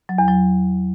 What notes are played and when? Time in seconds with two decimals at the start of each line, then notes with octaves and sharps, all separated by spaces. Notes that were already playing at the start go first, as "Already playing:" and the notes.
0.09 F#3
0.18 E2
0.28 F#3